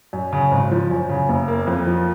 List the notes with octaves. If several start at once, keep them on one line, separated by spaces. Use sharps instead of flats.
F#2
C#3
G#1
F3
F#2
C#3
F#1
A#3
F2
F3